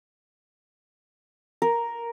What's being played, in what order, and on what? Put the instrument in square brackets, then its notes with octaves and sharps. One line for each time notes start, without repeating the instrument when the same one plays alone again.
[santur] A#4